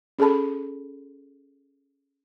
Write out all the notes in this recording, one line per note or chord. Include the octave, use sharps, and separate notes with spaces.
C#4 G#4 A4 A5 B5